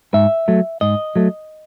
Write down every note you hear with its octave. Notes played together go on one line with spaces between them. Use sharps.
G#2 E5
F#3 A3
G#2 D#5
F#3 A3